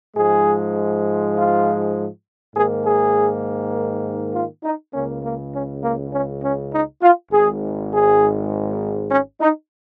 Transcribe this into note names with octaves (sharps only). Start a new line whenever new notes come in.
G#2 F3 G#3 G#4
F4
G#2 D#3 A#3 G#4
G#4
F4
D#4
C#2 C#3 A#3 C#4
A#3
C#4
A#3
C#4
C#4
D#4
F4
G#1 G#2 G#3 G#4
G#4
C#4
D#4